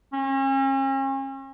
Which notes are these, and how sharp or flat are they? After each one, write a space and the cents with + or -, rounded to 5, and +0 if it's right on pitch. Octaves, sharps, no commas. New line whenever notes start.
C#4 -40